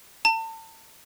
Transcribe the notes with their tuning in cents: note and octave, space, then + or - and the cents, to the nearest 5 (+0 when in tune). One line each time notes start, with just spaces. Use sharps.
A5 +35